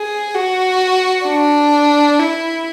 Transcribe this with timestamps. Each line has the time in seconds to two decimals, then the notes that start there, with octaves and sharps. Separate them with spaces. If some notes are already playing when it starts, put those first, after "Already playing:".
Already playing: G#4
0.35 F#4
1.27 D4
2.19 E4